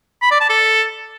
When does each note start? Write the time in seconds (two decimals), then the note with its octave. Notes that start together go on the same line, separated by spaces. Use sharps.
0.22 B5
0.31 D5
0.40 A5
0.50 A4